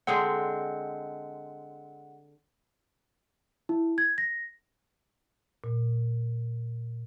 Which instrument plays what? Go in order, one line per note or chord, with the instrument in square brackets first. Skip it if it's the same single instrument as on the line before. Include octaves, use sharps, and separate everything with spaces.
[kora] D3 G#3 C4 [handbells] F#5
[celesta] E4
G#6
A#6
[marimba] A#2